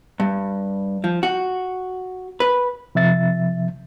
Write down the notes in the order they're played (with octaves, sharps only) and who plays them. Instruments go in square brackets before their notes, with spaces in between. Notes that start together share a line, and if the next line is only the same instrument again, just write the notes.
[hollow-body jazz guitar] G2
F3
F#4
B4
[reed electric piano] C3 F3 E5 A6